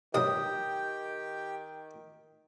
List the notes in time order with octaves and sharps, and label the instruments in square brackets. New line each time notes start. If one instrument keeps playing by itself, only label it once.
[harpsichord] B1 G2 F#3 [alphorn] D#3 [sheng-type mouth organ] G4 G5 [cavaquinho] D#6